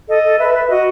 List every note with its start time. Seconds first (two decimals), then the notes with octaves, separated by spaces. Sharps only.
0.08 A4 D#5
0.24 A4
0.38 B4 E5
0.53 B4
0.69 F#4 D#5